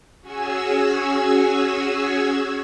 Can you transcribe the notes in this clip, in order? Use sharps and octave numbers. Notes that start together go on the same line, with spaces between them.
C#4 F#4 G#4 G#5 E6